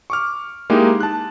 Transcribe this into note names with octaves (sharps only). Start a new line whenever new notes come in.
C#6 D6 F6
G#3 A#3 D#4 E4 G4
A5 F#6